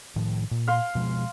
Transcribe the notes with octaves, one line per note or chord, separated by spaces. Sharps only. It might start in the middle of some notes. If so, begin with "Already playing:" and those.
A2 D#3 F3
A#2
F5 C6
B2 F3 G#3